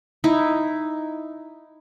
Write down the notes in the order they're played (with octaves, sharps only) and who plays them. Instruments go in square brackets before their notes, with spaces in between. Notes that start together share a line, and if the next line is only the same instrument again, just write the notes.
[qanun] D#4 E4